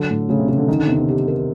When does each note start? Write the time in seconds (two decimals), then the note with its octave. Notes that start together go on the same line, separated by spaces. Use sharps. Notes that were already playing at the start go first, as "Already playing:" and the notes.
Already playing: D3 F#3
0.10 A2
0.29 C#3 A3
0.39 C3
0.48 C#3 C#4
0.58 D3
0.68 D#3 D#4
0.78 D3
0.87 C3 B3
0.98 C3
1.08 G4
1.28 A#4